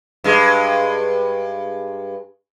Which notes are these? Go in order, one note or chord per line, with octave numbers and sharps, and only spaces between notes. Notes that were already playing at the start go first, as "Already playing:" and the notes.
G2 G#3